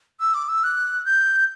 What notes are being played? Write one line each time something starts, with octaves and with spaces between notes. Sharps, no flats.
E6
D6
E6
F#6
G6